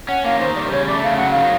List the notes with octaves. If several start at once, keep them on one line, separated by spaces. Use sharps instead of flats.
C#4 F#5
A#3 F5
D#3 C5
G3 D5
C5
C#3 C#5
A3 D5
C#3 F5
F#3 F#5
D#3 F5